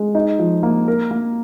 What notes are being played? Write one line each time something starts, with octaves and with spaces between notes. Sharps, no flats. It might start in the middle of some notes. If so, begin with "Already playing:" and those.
Already playing: G#3
D#4
F3
A#3
A#4
A#3